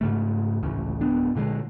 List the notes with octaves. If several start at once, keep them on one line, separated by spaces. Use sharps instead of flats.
G#2 C#3 A3
A1 D2 C#3
D1 B3 D4
A#2 D3 D#3 G#3